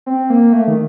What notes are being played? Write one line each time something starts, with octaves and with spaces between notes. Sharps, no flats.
C4
A#3
A3
D#3